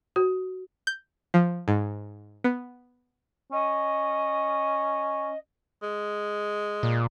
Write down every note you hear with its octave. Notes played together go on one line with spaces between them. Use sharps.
F#4
G6
F3
G#2
B3
C#4 D#5
G#3
A#2